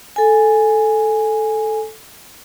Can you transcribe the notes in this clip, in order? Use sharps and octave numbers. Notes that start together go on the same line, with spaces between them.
A4 G#5